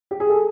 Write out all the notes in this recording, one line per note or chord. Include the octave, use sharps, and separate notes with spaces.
G4
G#4
A4